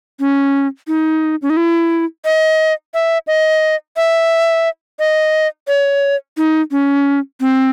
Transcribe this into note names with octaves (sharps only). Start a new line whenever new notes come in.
C#4
D#4
C#4
D#4
E4
D#5
E5
D#5
E5
D#5
C#5
D#4
C#4
C4